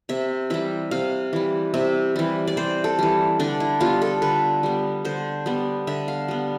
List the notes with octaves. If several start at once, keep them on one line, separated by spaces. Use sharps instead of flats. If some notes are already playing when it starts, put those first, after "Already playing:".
C3 E5
E3 G3 E5
C3 F5
E3 G3
C3 E5
E3 G3
D5
C3 C5
A4
E3 G3
D3 D4
E4
G3 B3 F4
A4
D3 B4
G3 B3
D3 C5
G3 B3
D3 E5
F5
G3 B3